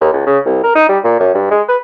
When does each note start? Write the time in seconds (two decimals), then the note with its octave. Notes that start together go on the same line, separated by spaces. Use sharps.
0.01 D#2
0.12 C#2
0.26 C#3
0.46 C2
0.63 A#4
0.75 D#4
0.89 G3
1.04 A#2
1.20 F#2
1.35 G2
1.51 G#3
1.68 B4